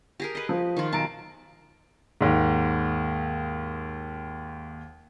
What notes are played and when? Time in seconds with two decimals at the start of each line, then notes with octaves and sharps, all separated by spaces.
0.20 G4 G#4 A#4
0.35 B4 D#5
0.49 F3
0.77 D#3 F4
0.93 B1 A5 A#5 D7
2.21 D#2 G#2